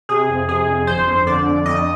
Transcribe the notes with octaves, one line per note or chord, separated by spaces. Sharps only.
C3 G#4
F2
C3 G#4
F2
G1 C5
F2
D3 D5
F2
F2 D#5